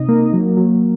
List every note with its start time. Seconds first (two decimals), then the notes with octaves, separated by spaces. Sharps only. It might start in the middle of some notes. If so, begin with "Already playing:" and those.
Already playing: C3 D#4 D#5
0.08 A#3
0.33 F#3
0.57 F#3